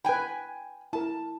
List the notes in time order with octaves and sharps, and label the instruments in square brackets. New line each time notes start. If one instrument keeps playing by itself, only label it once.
[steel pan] B4 B5 [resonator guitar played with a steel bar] G5 G#5
[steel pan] E4 A#4 [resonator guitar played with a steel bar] A5